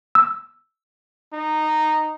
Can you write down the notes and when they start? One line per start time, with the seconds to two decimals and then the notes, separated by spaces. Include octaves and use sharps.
0.15 E6
1.33 D#4